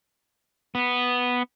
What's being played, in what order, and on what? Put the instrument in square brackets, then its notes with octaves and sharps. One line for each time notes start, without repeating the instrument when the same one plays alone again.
[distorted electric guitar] B3